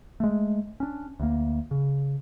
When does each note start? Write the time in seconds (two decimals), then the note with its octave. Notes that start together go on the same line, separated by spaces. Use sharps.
0.20 G#3 A3
0.80 C#4 D4
1.20 D2 A#3
1.71 C#3